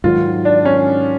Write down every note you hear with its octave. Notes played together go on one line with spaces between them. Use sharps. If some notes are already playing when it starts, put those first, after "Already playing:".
G#2 D#3 F#3 F4
D4
C#4